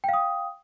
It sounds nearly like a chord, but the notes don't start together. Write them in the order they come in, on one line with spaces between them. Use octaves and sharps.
G5 F5 D#6